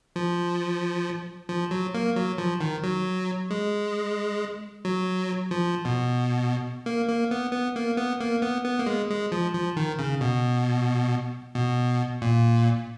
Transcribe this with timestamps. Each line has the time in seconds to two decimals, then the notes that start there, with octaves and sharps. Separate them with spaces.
0.16 F3
1.49 F3
1.71 F#3
1.95 A#3
2.16 F#3
2.38 F3
2.61 D#3
2.84 F#3
3.51 G#3
4.85 F#3
5.51 F3
5.85 B2
6.86 A#3
7.08 A#3
7.31 B3
7.52 B3
7.76 A#3
7.97 B3
8.21 A#3
8.42 B3
8.65 B3
8.79 A#3
8.86 G#3
9.10 G#3
9.32 F3
9.54 F3
9.77 D#3
9.99 C#3
10.21 B2
11.55 B2
12.22 A#2